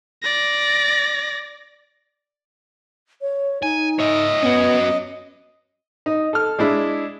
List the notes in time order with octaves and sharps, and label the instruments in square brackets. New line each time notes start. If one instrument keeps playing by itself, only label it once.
[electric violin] D5 A#6
[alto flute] C#5
[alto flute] D#4 [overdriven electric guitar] G#5
[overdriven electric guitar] C#5 E5 [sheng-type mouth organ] D#5
[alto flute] B3 [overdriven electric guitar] C#4 F#4
[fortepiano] D#4
A4 F6
G#3 D4 E4